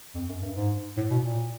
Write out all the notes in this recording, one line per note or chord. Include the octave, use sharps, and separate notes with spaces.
F2
F#2
G2
G#2
A2
B2
A#2